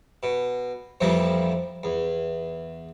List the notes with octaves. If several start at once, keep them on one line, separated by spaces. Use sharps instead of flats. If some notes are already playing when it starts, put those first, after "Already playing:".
B2
F2 A#2 E3 F3 G3
E2